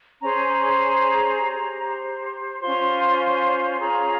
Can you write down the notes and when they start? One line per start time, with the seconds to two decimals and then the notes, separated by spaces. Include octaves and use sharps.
0.22 C#4 G#4 C5 A#5
0.35 G#5
0.49 A#5
1.41 G4 C5
2.61 C#4 F4 C5 C6
3.80 C#4 F4 G#4 A#5